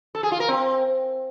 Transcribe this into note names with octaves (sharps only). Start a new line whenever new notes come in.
A4
G#4
F4
A#4
C4